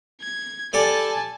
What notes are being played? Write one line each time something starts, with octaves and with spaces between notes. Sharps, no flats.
G#6
G3 A4 D5 G#5 A5